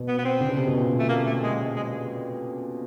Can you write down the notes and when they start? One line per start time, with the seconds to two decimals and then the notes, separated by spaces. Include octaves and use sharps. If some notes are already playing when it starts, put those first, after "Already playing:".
Already playing: B2
0.08 B3
0.19 B3
0.25 C4
0.40 D3
0.49 C#3
0.57 C3
0.67 B2
0.76 A#2
0.99 A3
1.09 A#3
1.26 A3
1.43 G#3
1.76 G#3